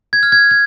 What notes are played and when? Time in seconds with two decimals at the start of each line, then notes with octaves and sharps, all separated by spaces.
0.13 G#6
0.23 F6
0.32 G#6
0.51 G#6